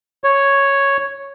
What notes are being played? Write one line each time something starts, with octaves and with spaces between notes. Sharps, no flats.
C#5